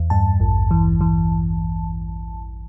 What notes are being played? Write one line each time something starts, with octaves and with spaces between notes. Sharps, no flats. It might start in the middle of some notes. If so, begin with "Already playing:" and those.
Already playing: E2
G2 A5
A1
E3
E3